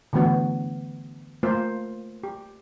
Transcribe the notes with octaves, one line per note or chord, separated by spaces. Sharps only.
D3 E3 A3 B3 F#4
A3 A#3 F4 C5
G4